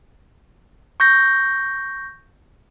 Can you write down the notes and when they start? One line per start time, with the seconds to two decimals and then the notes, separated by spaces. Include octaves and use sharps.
1.00 C#6 G6 A#6